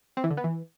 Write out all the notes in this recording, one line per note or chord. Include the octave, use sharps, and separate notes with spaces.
C4
E3
D3
B3
E3